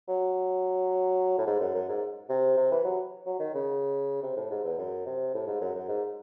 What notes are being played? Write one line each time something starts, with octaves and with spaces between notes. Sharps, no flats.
F#3
A2
G#2
F#2
F#2
G#2
C3
C3
E3
F#3
F#3
D#3
C#3
C3
A2
G#2
E2
F#2
C3
A2
G#2
F#2
F#2
G#2